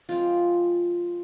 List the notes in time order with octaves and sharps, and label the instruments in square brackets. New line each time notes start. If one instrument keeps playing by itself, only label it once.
[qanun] F3 G#3 C4 F4